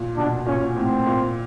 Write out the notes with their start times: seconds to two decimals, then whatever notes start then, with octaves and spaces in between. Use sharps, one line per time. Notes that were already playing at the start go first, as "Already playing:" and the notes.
Already playing: A#2
0.17 B2 D4
0.46 A#2 C#4
0.76 A2 C4
1.07 A#2